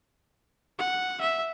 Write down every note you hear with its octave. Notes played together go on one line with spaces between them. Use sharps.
F#5
E5